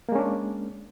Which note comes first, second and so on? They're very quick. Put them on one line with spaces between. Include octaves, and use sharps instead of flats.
A#3 G#3 C#4 D4